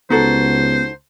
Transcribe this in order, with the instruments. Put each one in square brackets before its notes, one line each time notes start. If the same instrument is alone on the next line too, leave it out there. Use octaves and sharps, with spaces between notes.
[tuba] C#2 [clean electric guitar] B3 [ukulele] D#4 F#4 A4 [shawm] C5